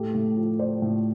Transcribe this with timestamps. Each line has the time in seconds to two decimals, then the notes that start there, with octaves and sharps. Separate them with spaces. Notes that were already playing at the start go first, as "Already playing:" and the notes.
Already playing: A2 G4 A4
0.14 A2
0.37 F3
0.59 F3 C5 D5
0.82 A2